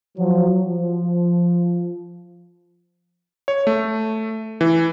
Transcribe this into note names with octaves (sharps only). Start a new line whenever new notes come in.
F3 F#3
F3
C#5
A3
E3